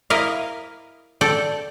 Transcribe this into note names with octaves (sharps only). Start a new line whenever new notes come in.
E4 A#4 D#5 F5
A4 D5 G5